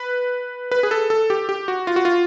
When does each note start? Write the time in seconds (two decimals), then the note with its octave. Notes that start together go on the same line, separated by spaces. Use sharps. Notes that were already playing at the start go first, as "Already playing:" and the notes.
Already playing: B4
0.71 B4
0.83 G#4
0.91 A4
1.10 A4
1.30 G4
1.49 G4
1.68 F#4
1.87 F4
1.96 F#4
2.05 F4